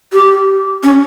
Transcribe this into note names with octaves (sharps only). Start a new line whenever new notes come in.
G4
C#4